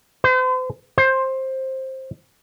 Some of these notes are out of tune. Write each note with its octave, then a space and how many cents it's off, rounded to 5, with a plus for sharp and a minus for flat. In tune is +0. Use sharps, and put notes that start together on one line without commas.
C5 -40
C5 +15